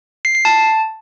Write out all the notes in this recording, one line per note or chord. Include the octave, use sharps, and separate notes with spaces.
C7
C7
A5